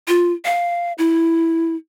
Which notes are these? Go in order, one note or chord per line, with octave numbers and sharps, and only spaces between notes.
F4
F5
E4